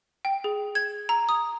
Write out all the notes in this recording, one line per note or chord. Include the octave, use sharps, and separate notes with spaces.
G5
G#4
G#6
A#5
D#6